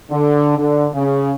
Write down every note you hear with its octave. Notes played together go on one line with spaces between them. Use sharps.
D3
D3
C#3